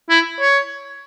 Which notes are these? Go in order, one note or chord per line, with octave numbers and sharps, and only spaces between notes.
E4
C#5